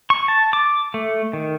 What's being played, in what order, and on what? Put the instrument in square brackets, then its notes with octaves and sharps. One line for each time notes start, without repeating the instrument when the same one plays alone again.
[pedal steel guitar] C#6
A5
D6
A3
D#3